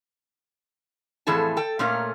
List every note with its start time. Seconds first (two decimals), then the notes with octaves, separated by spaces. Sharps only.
1.27 F2 A2 E3 G#4 A4 A5
1.57 A4 G5
1.79 A#2 A3 C#4 F4 A#4